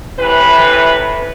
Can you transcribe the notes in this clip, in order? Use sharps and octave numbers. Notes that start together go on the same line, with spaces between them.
A2 C3 E3 B4